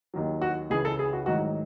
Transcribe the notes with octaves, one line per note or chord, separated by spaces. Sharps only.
D#2 D#3 F#3
F#4
C#2 C#3 E3 G#4
A4
G#4
F#4
A1 G#2 D#3 F#3 F#4